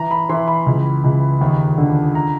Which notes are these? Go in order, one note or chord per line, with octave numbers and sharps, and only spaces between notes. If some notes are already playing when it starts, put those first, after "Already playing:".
Already playing: E3 A#5
B5
E3 C6
B5
C#2
C#2
D#2
D3
A#5